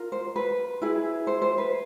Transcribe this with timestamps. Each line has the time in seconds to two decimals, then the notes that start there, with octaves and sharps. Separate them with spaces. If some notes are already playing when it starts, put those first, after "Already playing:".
Already playing: F4 A#4
0.12 C5
0.36 B4
0.82 E4 G#4 B4
1.27 C5
1.42 C5
1.58 B4